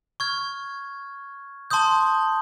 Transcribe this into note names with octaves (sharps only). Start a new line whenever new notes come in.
C#6 F6 G#6
A5 C6 D#6 G6